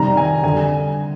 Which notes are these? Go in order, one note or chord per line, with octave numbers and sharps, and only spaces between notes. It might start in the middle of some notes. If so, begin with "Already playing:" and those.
Already playing: C3 D#3 G3 A#5
G#5
D3 G3 G#5